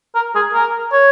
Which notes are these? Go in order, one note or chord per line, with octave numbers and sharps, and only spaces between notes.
A#4
G#4
A#4
C#5